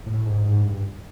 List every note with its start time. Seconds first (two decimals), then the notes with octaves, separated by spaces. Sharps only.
0.06 A2
0.26 G#2
0.45 G#2
0.66 G2